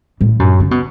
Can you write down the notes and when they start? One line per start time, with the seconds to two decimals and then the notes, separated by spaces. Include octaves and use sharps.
0.21 A2
0.39 F#2
0.60 C#3
0.71 B2